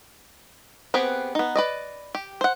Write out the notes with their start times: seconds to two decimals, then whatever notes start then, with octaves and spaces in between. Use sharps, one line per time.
0.94 B3 C4 G4 G#4 B4
1.35 B3 D#4
1.56 B4 D5 D#5
2.15 G4
2.41 C5 F#5